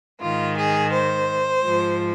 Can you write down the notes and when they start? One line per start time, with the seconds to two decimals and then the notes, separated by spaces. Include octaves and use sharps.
0.21 G#2 D#3 F4
0.58 G#4
0.93 C5
1.64 G#2 F3